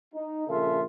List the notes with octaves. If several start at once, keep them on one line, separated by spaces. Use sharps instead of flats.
D#4
A#1 C#3 F4 A4 A#4 E5